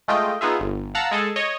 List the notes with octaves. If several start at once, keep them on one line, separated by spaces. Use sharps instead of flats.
G#3 A3 F4 D#5 G5
B3 D#4 F4 G#4 E5
G1
F5 F#5 A5 A#5 E6
G#3 G#4 A4
C#5 D#5